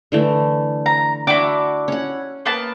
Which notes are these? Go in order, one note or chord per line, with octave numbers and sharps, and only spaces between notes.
D3 E3 A3
A#5
D4 E4 F#4 D6
C#4 F#5
A#3 B3 A5